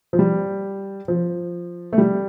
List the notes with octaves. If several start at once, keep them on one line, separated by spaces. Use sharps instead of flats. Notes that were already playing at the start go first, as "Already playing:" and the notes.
F3
G3
F3
A3
G3